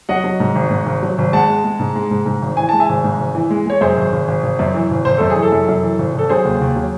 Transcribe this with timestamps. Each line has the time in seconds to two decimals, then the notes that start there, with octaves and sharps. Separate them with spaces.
0.09 F#3 D#5 F#5
0.24 F#3
0.40 G#2
0.55 G#1
0.70 G#2
0.86 G#1
1.03 F#3
1.18 G#1
1.33 G#3 F#5 A5
1.49 G#3
1.64 G#3
1.79 G#2
1.95 G#3
2.11 G#2
2.26 G#2
2.42 G#1
2.57 E3 G#5
2.69 G#3 A5
2.80 E5 G#5
2.89 G#1
3.04 G#2
3.20 G#1
3.35 E3
3.50 G#3
3.66 G#3 C#5
3.81 F#2 G#4 C5
3.97 G#1
4.13 G#1
4.28 G#1
4.43 G#1
4.59 F#2
4.74 E3
4.91 G#1
5.05 G#1 C5
5.18 F#2 A4
5.30 G#4
5.36 E3
5.42 A4
5.52 F#2
5.68 F#2
5.83 E3
5.99 G#1
6.14 G#1 A4
6.30 F#3 G#4 C5
6.45 D#2
6.61 D#2
6.76 F#3